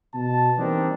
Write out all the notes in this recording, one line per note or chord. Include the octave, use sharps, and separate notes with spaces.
B2 A5
E3 G3 A#3 C4 D4 D#4